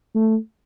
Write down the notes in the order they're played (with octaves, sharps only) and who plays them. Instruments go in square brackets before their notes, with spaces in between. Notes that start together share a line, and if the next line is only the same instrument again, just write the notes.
[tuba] A3